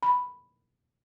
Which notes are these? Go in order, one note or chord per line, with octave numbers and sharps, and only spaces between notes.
B5